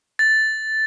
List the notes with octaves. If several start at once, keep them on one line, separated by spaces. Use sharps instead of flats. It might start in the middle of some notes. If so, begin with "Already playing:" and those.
A6